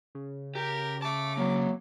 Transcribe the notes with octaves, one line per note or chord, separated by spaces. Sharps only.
C#3
G4 A#4
E5 A5 D6
F#3 A#3 C4